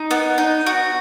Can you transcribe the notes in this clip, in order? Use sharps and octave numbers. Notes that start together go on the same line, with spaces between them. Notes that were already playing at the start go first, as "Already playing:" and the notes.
Already playing: D#4
B3
D#4
F#4